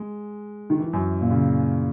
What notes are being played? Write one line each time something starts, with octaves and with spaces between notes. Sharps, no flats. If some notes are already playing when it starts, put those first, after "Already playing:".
Already playing: G#3
D#3
E3
F#2
A#2
C#3